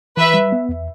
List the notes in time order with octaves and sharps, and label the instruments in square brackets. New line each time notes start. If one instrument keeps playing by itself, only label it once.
[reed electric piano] E3 [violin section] B4 E5
[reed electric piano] G3
B3
E2